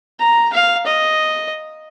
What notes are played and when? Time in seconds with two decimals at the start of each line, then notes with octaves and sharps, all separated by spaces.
0.20 A#5
0.53 F5
0.86 D#5